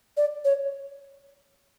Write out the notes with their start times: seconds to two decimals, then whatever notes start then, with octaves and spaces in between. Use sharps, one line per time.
0.17 D5
0.45 C#5